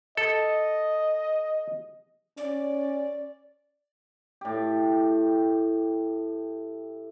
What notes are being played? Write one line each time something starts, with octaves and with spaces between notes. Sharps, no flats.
A4 D#5
C#4 D5
A2 G4